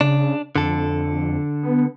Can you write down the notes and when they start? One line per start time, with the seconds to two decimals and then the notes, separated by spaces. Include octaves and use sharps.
0.01 C#3 D4
0.56 F2 D3 A4
1.63 B3